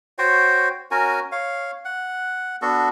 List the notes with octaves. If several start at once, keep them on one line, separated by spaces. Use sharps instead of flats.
F#4 C5 C#5 G5
C#4 F#4 A#4 G#5
C#5 F5
F#5
B3 D4 F#4 A4